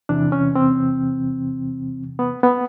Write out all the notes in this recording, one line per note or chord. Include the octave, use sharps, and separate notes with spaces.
E2 C3 E3 D4
C#4
C4
B3
B3